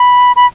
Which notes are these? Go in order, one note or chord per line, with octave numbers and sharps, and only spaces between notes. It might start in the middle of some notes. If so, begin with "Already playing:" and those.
Already playing: B5
B5